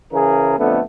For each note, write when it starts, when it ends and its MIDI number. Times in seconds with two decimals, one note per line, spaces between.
0.12 0.55 49
0.12 0.55 52
0.12 0.55 68
0.12 0.55 70
0.57 0.80 41
0.57 0.80 50
0.57 0.80 57
0.57 0.80 59